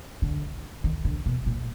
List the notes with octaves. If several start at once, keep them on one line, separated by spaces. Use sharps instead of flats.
D3
D#3
D3
B2
A#2